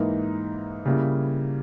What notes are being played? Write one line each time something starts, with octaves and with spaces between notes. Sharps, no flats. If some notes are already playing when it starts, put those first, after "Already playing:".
Already playing: G#2 E3 A#3 D#4 A#4
C#3 G3 A#3 E4